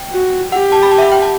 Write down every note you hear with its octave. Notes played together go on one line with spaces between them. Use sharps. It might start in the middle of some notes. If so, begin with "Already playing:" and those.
Already playing: G5
F#4
G4 F#5
A5
B5
A5
E5
F#5
G5
A5